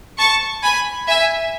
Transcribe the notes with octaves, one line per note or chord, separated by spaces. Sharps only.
A5 C#6
G#5 B5
E5 G#5